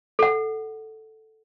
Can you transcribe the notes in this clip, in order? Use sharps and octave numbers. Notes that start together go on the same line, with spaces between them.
A4 F#5